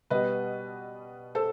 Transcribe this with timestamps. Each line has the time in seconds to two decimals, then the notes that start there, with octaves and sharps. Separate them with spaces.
0.10 B2 G3 B4 D#5
1.35 A4 C5